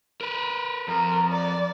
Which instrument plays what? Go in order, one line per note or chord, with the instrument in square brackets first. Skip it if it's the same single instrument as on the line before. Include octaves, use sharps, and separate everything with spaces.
[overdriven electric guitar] A#4 B4
[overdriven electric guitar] F2 [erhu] A#4
[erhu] D5